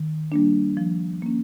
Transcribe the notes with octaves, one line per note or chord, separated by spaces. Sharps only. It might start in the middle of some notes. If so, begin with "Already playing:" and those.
Already playing: D#3
G3 A#3 D4
F3
A#3 C#4